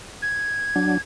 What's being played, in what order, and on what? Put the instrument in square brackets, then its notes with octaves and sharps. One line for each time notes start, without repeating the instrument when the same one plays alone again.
[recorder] G#6
[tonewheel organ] F#3 D4